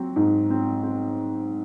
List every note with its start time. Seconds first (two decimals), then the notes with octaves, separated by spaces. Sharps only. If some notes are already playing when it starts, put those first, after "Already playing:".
Already playing: F#3 C4
0.16 G#2
0.50 C4
0.83 C4